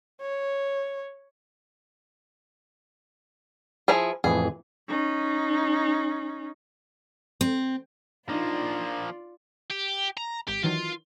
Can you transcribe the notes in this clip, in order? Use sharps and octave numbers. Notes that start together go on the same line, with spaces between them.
C#5
F3 E4 G#4
F2 A2 E3 G#4
C#4 D#4
C4
F3 A#3 D4 D#4 F4 D5
G4
A#5
G#1 G4
D#3 E3 F#3 F4